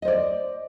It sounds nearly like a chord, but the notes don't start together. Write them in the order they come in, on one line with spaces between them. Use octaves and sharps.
D#5 C5 D5